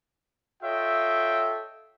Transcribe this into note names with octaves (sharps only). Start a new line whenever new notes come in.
F4 A4 C#5 D#5 E5 G5